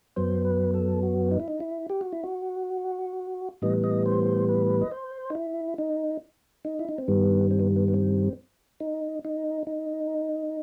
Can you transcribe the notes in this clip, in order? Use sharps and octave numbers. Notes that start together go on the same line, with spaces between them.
F#2 F#3 B3 C5
B4
A4
F#4
D#4
E4
D#4
E4
G4
F#4
E4
F#4
A2 E3 G3 B3 D#5
D#5
C5
B4
D#5
C5
D#4
E4
D#4
D#4
E4
D#4
C4
G2 D#3 G3 B3
C4
B3
B3
B3
C4
D#4
D#4
D#4